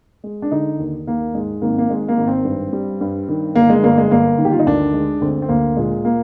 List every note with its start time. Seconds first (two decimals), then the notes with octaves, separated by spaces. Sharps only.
0.24 G#3
0.42 D4
0.51 D3 D#4
0.79 D#2
1.07 D#2 A#3
1.34 G#2 G#3
1.62 G#1 A#3
1.78 A#3
1.89 G#2 G#3
2.08 A#3
2.18 G#1
2.27 C4
2.45 G2
2.73 G3
3.01 G2
3.29 D#3
3.55 G1 A#3
3.70 G#3
3.83 G1 A#3
3.98 G#3
4.11 G1 A#3
4.38 D#3
4.45 G4
4.52 F4
4.59 D#4
4.66 D2 D4
4.93 G#3
5.21 D2 C4
5.42 C4
5.49 D2 A#3
5.76 A#2 G#3
6.05 A#3